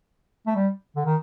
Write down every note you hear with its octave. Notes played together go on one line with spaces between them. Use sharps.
A3
G3
D3
D#3